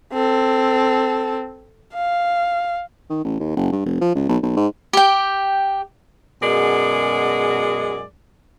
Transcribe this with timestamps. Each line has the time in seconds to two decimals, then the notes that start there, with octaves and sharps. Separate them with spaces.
0.13 C4 A4
1.94 F5
3.10 D#3
3.25 A1
3.40 D#2
3.57 F#1
3.73 G2
3.86 F1
4.01 F3
4.15 C#2
4.29 B1
4.43 B1
4.57 G#2
4.93 G4 G5
6.42 F#2 B2 G#3 G#4 A#4 D5